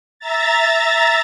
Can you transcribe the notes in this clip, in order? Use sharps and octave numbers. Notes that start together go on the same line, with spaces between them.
E5 A#5 A6